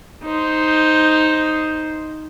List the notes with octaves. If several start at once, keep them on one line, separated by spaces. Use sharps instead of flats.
D#4 C5